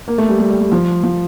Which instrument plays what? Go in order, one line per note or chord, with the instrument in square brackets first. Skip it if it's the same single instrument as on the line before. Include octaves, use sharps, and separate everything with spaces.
[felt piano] A#3
A3
G3
G3
G3
G3
F3
F3